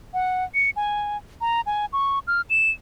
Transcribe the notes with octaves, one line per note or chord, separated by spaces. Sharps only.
F#5
C#7
G#5
A#5
G#5
C#6
F6
E7